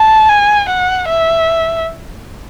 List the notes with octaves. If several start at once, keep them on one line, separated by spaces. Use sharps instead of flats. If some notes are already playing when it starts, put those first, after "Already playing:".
Already playing: A5
G#5
F#5
E5